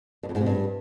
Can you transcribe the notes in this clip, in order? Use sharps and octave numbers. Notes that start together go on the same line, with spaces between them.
G2
F2
G#2
C3
G2